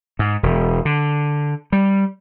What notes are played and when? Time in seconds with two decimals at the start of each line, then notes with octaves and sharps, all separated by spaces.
0.19 G#2
0.43 E1
0.85 D3
1.72 G3